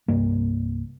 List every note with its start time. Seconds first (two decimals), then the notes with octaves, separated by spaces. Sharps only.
0.08 C2 G2 A#3